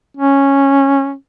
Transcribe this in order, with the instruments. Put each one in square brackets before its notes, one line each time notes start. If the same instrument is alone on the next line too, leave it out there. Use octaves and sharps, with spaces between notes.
[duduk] C#4